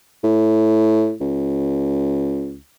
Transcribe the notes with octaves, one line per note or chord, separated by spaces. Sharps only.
A2
C#2